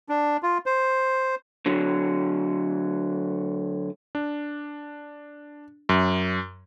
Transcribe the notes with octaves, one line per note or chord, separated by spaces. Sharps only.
D4
F4
C5
D3 F#3
D4
F#2